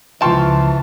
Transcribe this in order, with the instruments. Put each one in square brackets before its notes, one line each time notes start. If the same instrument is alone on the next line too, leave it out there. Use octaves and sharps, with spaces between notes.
[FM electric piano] C#2 F3 F6 [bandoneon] E3 [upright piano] G5 C6 C#6 [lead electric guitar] A5